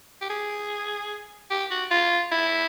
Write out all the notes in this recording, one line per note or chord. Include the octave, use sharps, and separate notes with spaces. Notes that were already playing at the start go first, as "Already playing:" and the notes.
G4
G#4
G4
F#4
F4
E4